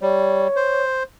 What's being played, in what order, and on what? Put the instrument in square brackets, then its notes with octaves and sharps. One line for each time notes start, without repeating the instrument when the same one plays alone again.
[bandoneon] G3 [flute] C#5
[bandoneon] C5